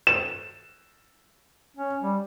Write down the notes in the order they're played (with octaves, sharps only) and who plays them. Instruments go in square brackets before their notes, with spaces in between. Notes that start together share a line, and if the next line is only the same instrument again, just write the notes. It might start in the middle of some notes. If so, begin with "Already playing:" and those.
[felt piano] E7
[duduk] C#4
G3